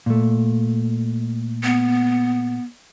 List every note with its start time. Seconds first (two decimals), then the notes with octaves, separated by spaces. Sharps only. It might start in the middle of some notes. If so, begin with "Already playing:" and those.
0.06 A#2 A3
1.63 B3